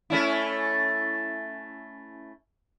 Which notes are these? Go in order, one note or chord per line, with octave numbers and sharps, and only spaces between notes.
A3 C#4 E4